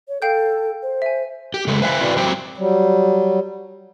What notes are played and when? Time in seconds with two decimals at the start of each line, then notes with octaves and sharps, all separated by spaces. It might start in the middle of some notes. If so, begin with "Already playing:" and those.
0.08 C#5
0.22 A4 F5 G5 G6
0.83 C5
1.02 E5 G#5
1.54 G4
1.68 C#3 G#3 A3
1.82 B4 C5 E5 F5 G#5
2.01 C4 E4 F#4 B4 D5 F5
2.17 F#3 C4 G4 C5 G5
2.57 F#3 G3